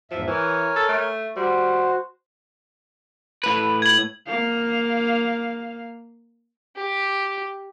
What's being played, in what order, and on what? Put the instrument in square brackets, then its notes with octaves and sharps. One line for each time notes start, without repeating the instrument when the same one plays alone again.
[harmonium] E2 G#2 E5 [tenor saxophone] F3
[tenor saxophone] E3 [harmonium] A#4 C#5 G#5
[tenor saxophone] A4
A3
[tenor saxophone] G3 [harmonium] F#4 C5
[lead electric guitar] A2 B4
[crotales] G#6 F#7
[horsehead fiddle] A#3 F5
[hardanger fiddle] G4